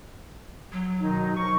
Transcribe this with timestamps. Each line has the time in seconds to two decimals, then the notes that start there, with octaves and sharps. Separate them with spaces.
0.72 F#3
1.00 B2 D#3 D#4
1.36 F3 A#4 C#6